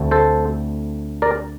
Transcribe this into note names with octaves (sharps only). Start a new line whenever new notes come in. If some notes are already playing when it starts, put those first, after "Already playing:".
Already playing: D2 D3 A3 C4
A4 C5
A#4 D5